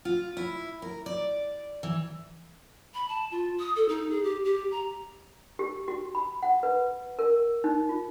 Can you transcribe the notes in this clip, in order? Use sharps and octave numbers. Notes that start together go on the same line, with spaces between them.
F4
E4
A#4
D5
E3
B5
A5
F4
D#6
A4
D#4
G#4
G4
G4
A#5
G4
F#4
B5
F#5
B4
A#4
D#4
F4